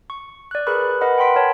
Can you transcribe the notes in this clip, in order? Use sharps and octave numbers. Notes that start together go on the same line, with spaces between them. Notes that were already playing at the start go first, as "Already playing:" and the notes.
C#6
D5 F#6
G#4 A#4 B4 B5 C#6 F#6
A#4 B4 D#5 F#5 B5
F#5 G5 B5 C6 B6 D7
A#4 C#5 A5